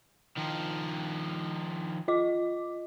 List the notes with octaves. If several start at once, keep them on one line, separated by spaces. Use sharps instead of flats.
D#3 F3
F4 D#5 D6